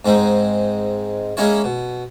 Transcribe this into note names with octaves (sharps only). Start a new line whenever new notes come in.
G#2 G#3 C4 D#4
G#3 A#3 C#4 E4 C#5
B2